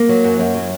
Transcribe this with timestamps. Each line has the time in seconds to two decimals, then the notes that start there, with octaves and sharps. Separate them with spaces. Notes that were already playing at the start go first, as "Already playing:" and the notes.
Already playing: A#3
0.09 F#3
0.24 F#2
0.39 F#2
0.54 F#3